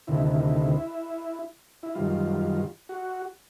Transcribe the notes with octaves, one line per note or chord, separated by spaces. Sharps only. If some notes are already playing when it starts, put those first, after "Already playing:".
D2 C3 D#3 E4
E4
F#2 D#3 G3 F4
F#4